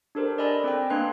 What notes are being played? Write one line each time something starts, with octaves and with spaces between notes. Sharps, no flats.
D4 G4 A4 A#4 C5
D5 D#5 G#5 B5 E6 A#6
C4 A4 G5
A#3 D4 B4 C6 F#6